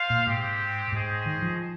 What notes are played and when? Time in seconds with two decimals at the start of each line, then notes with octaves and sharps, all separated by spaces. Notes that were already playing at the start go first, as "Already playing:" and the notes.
Already playing: F4 C5 F5
0.10 A#2
0.26 G#2 G#3 C4 G4
0.92 G#2 C#4 G#4 C5 D#5 G5
1.26 D#3
1.42 F3